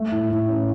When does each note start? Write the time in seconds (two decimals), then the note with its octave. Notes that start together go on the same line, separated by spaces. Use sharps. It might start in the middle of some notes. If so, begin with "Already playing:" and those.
Already playing: A3
0.12 A2
0.29 A2
0.49 C#4